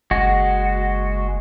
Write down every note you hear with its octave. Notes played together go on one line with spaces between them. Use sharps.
F#1 G#3 F#4